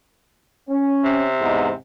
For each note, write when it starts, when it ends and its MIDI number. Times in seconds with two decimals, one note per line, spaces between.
0.69 1.26 61
1.04 1.73 48
1.40 1.69 40
1.40 1.69 44